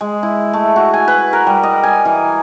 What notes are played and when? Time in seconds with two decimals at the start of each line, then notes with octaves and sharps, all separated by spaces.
0.01 G#3
0.23 E4
0.53 A3
0.76 F#4
0.94 G#5
1.08 B4
1.33 A#4
1.46 G3
1.63 D#5
1.83 G#5
2.05 E3